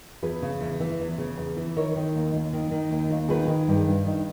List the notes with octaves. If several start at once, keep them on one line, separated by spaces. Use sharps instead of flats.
E2 G#4 B4
C#3
E2
E3
E2
C#3
E2
E3
D#3 A#4 C#5
D#3
D#2
D#2
D#3
D#3
D#2
D#2
D#3 G#4 B4
D#3
G2
G2
D#3